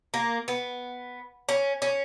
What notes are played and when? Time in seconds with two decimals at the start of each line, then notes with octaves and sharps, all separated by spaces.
0.14 A#3
0.48 B3
1.49 C#4
1.82 C#4